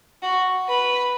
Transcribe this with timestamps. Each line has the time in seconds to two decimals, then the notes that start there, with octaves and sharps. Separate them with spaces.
0.23 F#4
0.68 B4